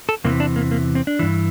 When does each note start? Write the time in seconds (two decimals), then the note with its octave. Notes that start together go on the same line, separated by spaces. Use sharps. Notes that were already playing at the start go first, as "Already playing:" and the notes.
0.09 A4
0.24 E2 C3 E3 A#3
0.40 D4
0.56 A#3
0.71 A#3
0.95 C4
1.07 D4
1.19 G2 E3